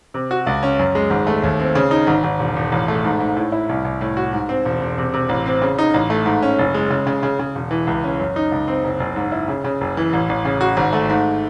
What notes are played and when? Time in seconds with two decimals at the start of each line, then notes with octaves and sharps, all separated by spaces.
0.14 C3
0.31 F#4
0.47 C#2
0.63 C#4
0.79 F#2
0.95 G#3
1.10 G#1
1.27 A3
1.44 D#2
1.60 C4
1.75 C#3
1.91 D#4
2.07 G#1
2.24 G#1
2.39 E1
2.56 E1
2.72 A1
2.88 A3
3.04 G#2
3.20 G#2
3.37 A2
3.52 E4
3.69 C2
3.85 C2
4.01 A2
4.17 F#4
4.33 G#2
4.49 C4
4.65 E1
4.81 E1
4.98 C3
5.14 C3
5.29 A1
5.46 C4
5.62 C#3
5.78 D#4
5.94 A1
6.10 A3
6.26 G#2
6.42 C#4
6.58 F#1
6.74 G#3
6.90 C#3
7.07 C#3
7.23 C#3
7.39 C#3
7.55 E1
7.71 E3
7.87 C#2
8.04 C#4
8.19 F#2
8.36 D#4
8.52 C#2
8.68 C4
8.84 F#1
9.00 F#1
9.16 G#2
9.32 E4
9.48 C#3
9.64 C#3
9.81 F#1
9.97 E3
10.13 A1
10.29 A1
10.45 C#3
10.61 F#4
10.77 G#1
10.93 A3
11.09 G#2